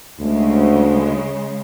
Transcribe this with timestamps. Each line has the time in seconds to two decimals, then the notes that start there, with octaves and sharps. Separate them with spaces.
0.19 D2 C#3 G#3